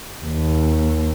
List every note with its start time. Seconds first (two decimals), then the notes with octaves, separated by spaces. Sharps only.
0.24 D#2